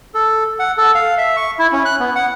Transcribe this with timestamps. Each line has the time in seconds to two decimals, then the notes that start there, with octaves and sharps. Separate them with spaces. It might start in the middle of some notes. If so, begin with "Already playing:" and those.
0.14 A4
0.59 F#5
0.77 A4
0.95 F5
1.18 E5
1.37 C#6
1.59 E4
1.72 C#4
1.85 F#6
2.00 B3
2.15 F#5